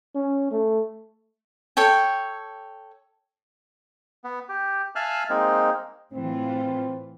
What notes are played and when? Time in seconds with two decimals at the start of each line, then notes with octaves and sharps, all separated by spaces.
0.15 C#4
0.51 A3
1.77 A4 C#5 G5
4.24 B3
4.49 G4
4.95 E5 F5 G#5 A5 F6 F#6
5.30 G#3 A#3 C4 D#4
6.13 A2 E3 C4 F4